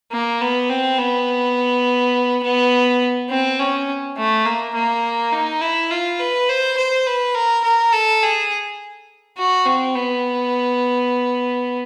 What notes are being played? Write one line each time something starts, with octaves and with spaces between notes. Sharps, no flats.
A#3
B3
C4
B3
B3
C4
C#4
A3
A#3
A#3
D#4
E4
F4
B4
C5
C5
B4
A#4
A#4
A4
G#4
F#4
C4
B3